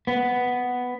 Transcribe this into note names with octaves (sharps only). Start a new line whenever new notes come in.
B3